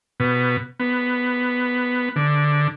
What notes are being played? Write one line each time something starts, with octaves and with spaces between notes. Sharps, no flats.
B2
B3
D3